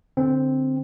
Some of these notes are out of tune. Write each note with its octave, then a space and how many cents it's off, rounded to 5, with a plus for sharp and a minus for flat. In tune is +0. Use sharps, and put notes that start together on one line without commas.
D3 +0 C4 +0